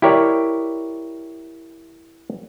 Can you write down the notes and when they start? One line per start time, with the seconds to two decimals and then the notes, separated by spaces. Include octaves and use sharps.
0.02 E4 G4 A#4 C#5 D5